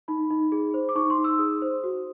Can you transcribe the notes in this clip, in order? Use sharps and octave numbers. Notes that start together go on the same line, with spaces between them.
D#4 B5
D#4
G#4
C5
D6
D#4 C#6
C6
D#4
E6
G#4 D#6
C5
F#4